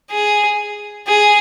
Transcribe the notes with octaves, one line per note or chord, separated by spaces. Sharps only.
G#4
G#4